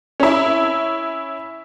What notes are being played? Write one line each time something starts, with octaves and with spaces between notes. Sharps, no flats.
C#4 E4